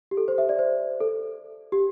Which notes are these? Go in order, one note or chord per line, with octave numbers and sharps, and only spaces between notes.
G4
A4
C5
E5
D5
C5
A4
G4